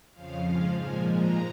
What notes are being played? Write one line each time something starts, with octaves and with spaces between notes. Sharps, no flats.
F2 C#3 F3 F5
G#2 F3 G#3 F5
A#2 F3 G#3 G#5
A#2 F3 G#3 A#5